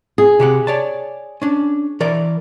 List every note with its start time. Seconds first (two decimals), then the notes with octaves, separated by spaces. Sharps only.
0.18 G#4
0.40 C3 G4 F#5
0.67 C#5 D5 A5
1.42 C#4 D4
2.00 E3 A#4 D5